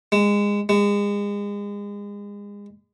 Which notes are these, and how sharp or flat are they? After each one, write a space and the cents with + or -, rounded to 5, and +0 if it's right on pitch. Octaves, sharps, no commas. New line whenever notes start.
G#3 -25
G#3 -35